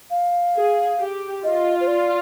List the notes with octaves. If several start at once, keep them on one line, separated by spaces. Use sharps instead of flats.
F5
G#4
G4
F4 D#5
C5
D5